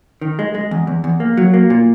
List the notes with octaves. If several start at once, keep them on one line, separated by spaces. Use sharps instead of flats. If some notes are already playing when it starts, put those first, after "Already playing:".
D#3
G#3
G#3
E2
E2
E2
A#3
F#3
A#3
A#2